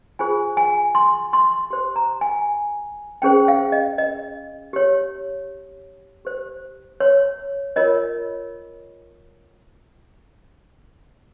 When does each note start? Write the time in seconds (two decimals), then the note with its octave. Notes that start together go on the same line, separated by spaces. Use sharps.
0.19 F4 G#4 C5 G#5
0.57 G#5
0.95 C6
1.33 C6
1.70 G4 C5
1.96 A#5
2.21 G#5
3.22 C#4 G#4 C5 G5
3.48 F5
3.72 D#5
3.98 D#5
4.73 G4 C#5
6.25 G4 C5
7.00 C#5
7.76 F4 A#4 C#5 D#5